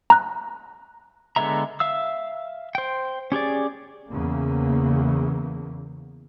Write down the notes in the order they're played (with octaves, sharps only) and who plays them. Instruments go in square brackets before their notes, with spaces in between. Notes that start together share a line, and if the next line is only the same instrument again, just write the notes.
[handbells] A#5 F#6
[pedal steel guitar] D3 G#3 B3 E5 A#5
E5 F5 E6
C5 G5
C#4 G4 G#4 D5
[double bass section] E2 C#3 A#3